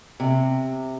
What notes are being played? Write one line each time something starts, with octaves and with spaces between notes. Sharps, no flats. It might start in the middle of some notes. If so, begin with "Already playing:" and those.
C3